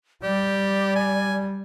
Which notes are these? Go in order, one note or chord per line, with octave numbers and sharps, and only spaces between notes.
G3 G4 D5
G#5